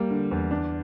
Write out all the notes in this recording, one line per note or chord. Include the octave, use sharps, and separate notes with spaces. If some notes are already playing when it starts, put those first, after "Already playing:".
Already playing: G3 A#3
D3
E2
D4